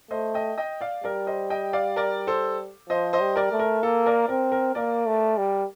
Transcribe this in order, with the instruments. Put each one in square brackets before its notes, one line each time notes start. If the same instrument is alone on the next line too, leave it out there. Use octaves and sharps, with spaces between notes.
[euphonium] A3 [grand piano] C5 D#5
[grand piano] D#5 G5
D#5 G5
D5 F5
[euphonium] G3 [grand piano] A#4 D5
[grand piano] C5 D#5
D#5 G5
D5 F5
A#4 D5
A4 C5
[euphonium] F3 [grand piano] C5 D#5
[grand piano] C5 D#5
[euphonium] G3
[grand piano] A#4 D5
[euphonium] A3
[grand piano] A#4
[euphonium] A#3 [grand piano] A4
[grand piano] A#4 D5
[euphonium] C4 [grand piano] A#4
[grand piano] A#4
[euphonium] A#3 [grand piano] A#4 D5
[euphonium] A3
G3